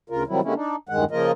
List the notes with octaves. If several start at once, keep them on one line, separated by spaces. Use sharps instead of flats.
D2 C#3 F4 A#4
C3 D#3 F#3 G3 E4
D3 G3 G#3 A#3 C#4 E4
D4 D#4
E2 G2 D#3 G#3 F#5
C#3 F3 A#3 F4 A#4 D#5